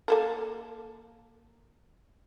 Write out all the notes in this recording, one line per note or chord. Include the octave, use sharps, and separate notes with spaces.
A#3 A4 A#4